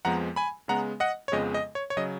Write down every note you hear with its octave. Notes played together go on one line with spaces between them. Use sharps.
F2 F3 G#3 B3 F#5 A#5
G#5 B5
C#3 G#3 B3 F#5 A#5
D#5 F#5
C#5
F2 C#3 F3 G#3 B3 D#5
D#5
C#5
C#5
C#3 F#3 D#5